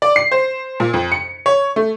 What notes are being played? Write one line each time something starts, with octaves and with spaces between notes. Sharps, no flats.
D5
C7
C5
A#2
F2
C#7
C#5
A3